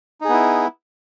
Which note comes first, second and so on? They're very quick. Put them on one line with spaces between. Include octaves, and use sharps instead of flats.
D#4 G#4 B3 E4